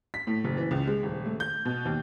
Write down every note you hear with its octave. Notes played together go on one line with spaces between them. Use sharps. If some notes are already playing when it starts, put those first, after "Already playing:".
B6
A2
F#1
E3
C#2
G#3
D#1
A3
G6
B2
D#2